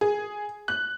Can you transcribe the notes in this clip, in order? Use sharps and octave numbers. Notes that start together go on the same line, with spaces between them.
G#4
F#6